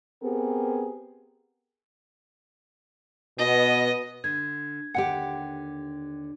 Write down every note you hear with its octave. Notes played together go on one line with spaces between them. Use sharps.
B3 C4 G4 G#4 A#4
B2 B3 D#5
D3 G#6
D#2 D3 G4 F#5 G5